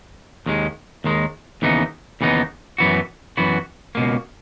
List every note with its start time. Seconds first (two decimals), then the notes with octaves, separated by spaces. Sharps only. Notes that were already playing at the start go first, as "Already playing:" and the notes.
0.46 D#2 D#3 G#3
1.04 D#2 D#3 G#3
1.62 D#2 C#3 E3 B3 D#4
2.21 D#2 C#3 E3 B3 D#4
2.78 F#2 E3 B3 F#4
3.37 F#2 E3 B3 F#4
3.95 C#2 B2 A#3